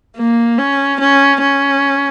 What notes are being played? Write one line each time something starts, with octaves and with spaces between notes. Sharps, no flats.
A#3
C#4
C#4
C#4